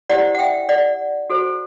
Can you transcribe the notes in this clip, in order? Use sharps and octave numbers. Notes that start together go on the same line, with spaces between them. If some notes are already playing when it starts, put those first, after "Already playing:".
E4 G4 C5 D5 F#5
F#5
E5 G5
D5 F#5
F#4 A4 C5